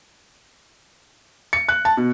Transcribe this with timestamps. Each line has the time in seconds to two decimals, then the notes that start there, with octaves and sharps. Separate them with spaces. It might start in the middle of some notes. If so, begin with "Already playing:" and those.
1.53 C#7
1.68 F#6
1.85 A5
1.97 B2